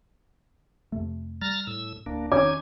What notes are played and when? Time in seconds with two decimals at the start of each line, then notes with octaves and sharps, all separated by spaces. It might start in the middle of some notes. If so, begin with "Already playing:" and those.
0.92 F2 C3 A3
1.41 G3 A#5 F6 A6
1.67 A2 E6
2.06 D1 A#3 D4
2.32 E1 D#3 C4 C#4 D#4 D6 G#6